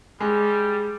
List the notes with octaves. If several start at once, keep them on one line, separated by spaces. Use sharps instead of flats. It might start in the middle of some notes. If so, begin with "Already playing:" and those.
G3 G#3